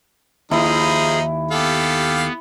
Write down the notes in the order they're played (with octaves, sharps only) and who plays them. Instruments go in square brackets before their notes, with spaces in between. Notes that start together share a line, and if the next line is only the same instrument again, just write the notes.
[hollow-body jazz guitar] D#2 [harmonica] F3 D#4 [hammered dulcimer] E4 [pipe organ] G#4
[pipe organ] B3 [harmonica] G4 A4 F5